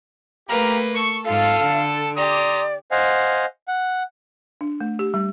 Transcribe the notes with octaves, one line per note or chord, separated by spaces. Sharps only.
A3 A#3 G4 B4 F5 A#5
A4 C#6
G#2 F4 A4 F5
D3
G4 D5 A#5 C6 D#6
C5 D#5 F5 F#5 G#5
F#5
D4
A3
G4
G3